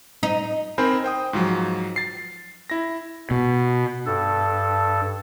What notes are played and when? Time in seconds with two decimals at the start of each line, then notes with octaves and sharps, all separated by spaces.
0.23 D#4
0.78 C4 D#4 A#4 C5 G#5 B5
1.04 C5 G5 D#6
1.33 G#2 F3 F#3
1.96 A6 C7
2.70 E4 A#6
3.31 B2
4.06 G2 A4